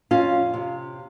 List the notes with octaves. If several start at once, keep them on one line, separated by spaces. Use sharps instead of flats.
F2 C#4 F4
C3